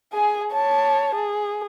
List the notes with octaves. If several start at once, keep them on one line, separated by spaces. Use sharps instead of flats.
G#4 G#5
C#5 A5
G#4